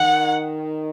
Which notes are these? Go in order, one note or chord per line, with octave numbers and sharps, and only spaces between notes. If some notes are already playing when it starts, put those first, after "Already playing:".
Already playing: D#3 F#5